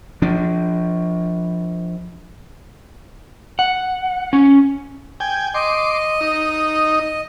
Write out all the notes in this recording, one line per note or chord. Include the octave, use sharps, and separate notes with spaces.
F3 D4
F#5
C#4
G5 G#5
D#5 C6 D6
D#4